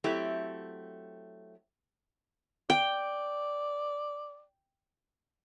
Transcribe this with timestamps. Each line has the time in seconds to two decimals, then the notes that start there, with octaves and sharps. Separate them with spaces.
0.04 F#3 A3 C4 E4 G4 E5
2.70 D5 G5